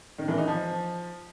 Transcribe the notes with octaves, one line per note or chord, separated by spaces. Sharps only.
D#3
E3
D#4
F3